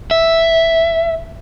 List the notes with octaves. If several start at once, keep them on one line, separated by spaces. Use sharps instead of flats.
E5